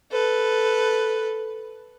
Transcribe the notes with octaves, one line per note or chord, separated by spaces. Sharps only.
A4 B4